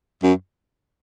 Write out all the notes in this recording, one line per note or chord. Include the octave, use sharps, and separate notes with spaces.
F#2